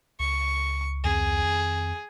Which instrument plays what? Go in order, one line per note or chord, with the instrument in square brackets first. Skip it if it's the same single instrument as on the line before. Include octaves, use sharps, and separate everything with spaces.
[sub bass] C#2 [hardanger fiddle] C#6
[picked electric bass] F2 D#3 C4 [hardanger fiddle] G#4